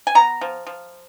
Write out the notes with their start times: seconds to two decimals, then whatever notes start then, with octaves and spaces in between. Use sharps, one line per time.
0.07 G#5
0.15 B3 A#5
0.41 F3
0.67 F3